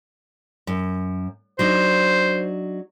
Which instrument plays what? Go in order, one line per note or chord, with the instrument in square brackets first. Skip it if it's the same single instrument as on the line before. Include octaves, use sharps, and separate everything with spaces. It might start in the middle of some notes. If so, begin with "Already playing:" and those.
[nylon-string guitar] F#2
[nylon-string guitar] F#3 D4 D#4 [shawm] C5